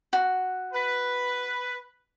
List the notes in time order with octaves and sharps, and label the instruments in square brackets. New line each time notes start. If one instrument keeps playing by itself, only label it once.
[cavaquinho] F#4
[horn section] B4